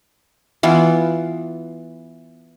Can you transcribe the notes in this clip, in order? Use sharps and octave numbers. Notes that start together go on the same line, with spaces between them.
E3 B3 F4